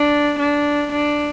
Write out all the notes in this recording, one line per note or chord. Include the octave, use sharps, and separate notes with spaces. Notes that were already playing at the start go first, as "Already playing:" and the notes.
Already playing: D4
D4
D4